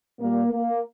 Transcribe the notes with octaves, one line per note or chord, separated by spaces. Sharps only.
A#2 G3 A#3
A#3